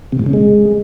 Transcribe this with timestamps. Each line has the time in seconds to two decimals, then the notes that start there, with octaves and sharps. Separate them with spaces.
0.12 C3
0.19 A2
0.26 C#3
0.33 G#3